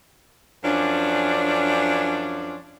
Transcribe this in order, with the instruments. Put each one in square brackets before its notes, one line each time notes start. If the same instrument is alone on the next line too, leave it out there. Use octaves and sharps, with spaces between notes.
[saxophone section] F#2 F3 C#4 D4